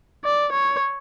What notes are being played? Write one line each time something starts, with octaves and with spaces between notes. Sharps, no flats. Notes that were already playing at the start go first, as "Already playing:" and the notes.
D5
C#5